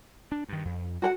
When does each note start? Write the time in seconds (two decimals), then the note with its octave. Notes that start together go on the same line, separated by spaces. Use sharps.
0.32 D4
0.49 G2 D#3
0.65 F2
1.02 F#4 A4 F#5